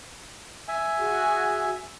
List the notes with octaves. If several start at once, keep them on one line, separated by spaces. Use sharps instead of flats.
E5 G#5
F#4 G#4 F#5